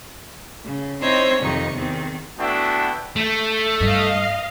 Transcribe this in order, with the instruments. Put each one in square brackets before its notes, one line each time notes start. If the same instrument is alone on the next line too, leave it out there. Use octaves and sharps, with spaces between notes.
[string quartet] C#3
C4 D#4 E4 C5 C#5 D#5
F2 C3 D#3 D#4 C#6
E2 D#3 C4
[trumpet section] A3 B3 D4 E4 F#4 G5
[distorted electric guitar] A3
[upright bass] G2 [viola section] D#5 F5